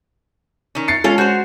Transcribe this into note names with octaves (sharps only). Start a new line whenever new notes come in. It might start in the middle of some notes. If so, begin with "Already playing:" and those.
D#3 C#4
A6 C7 C#7
G#3 C#4 F4 A4
F#4 C5